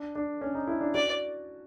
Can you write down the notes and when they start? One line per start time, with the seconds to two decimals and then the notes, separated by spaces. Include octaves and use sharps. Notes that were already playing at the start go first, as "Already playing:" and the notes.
Already playing: D4
0.15 D4
0.41 C#4
0.54 D#4
0.67 E4
0.81 D4
0.94 F#4 D5